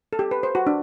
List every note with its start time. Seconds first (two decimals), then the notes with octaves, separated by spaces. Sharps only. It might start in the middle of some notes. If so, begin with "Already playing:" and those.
0.13 A4
0.19 G4
0.31 B4
0.43 C5
0.55 F#4
0.67 D4